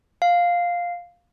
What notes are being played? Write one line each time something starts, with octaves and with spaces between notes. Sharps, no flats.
F5